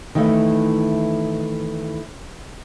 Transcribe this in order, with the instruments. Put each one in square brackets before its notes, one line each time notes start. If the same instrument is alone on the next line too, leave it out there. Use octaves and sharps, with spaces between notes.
[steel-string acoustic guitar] D#3 E3 A3 E4